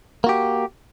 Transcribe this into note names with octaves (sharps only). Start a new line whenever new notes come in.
A#3 F#4 G4